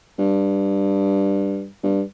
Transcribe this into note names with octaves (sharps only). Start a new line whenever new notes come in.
G2
G2